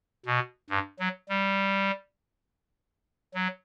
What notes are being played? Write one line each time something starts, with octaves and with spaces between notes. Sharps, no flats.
B2
G2
F#3
G3
F#3